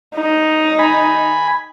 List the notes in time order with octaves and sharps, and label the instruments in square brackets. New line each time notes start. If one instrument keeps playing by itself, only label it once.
[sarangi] D#4
[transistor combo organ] G#5 B5